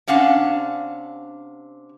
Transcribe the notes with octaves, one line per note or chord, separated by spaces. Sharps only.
C3 C#4 D4 F5 F#5